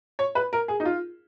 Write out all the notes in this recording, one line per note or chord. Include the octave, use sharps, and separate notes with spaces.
C#5
B4
A#4
G#4
D#4
F4